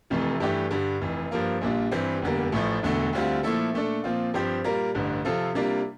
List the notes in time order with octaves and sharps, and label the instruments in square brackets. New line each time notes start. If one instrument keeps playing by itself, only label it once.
[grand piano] F1 F2 C3 E3 A3
G2 E3 A3 D4 G4
G2 D3 G3
F1 F2 E3
G2 F3 A#3 F4
A#1 A#2 G3 D4 F4
G2 E3 G3 C4
F1 E2 D3 G3 A#3
A1 A2 F3 A3
E1 E2 D3 A3
D2 D3 G3 C4 F4
A#2 F3 A3 E4 A4
A#2 A3 D4 A4
A#2 F3 C4 F4
G2 F3 C4 G4 C5
A#2 G3 A#3 F4 A#4
A1 G2 D3
C3 F3 C4 F4 A4
C3 G3 A#3 D4 F4